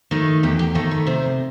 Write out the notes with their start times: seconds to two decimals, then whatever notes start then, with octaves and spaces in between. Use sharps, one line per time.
0.11 D#3 A3 D#4
0.43 E2 G4
0.59 G4
0.75 D#3 A3 D#4 A4
0.91 B4
1.07 C3 C5